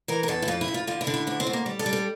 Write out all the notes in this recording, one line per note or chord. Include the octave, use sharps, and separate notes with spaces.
E3 A#4
A#4
E2 A4
E4
F2 F4
E4
F2
F4
D3 F4
E4
D3
E4
D2 E4
C4
D2
A#3
G3
A4
G3
A4